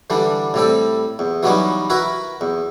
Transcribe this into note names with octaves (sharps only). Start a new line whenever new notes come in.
D3 E3 G3 D4
A2 G3 C4 A4
E2
E3 F#3 G3 B3 C#4 D#4
E4 F#4 A#4 B4
E2